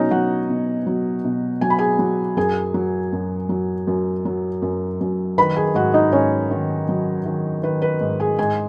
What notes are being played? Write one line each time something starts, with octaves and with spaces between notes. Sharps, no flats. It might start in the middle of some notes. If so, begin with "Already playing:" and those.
Already playing: B2 F#3 C#4 D#4 F#4 C#5 D#5
F#3 F#4 F#5
B2
F#3
B2
F#3 G#5
B5
G#4 G#5
F#3
F#2 G#4 G#5
F#3
F#2
F#3
F#2
F#3
F#2
F#2
D#3 B4 B5
G#4 G#5
G#2 F#4 F#5
D#4 D#5
G#2 C#4 C#5
D#3
F#3
D#3
D#3 B4
B4
G#2
G#4 G#5
G#2 G#4 G#5